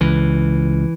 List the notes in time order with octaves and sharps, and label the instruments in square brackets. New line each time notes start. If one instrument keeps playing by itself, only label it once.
[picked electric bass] C#2 [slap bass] E3